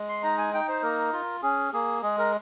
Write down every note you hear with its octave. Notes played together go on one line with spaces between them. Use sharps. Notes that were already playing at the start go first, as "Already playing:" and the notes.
Already playing: G#3
C6
D#4 A#5
G#5
D#4 G5
C5
A#3 A#4
F4
C#4 G#4
A#3 G#4
G#3 G#4
A#4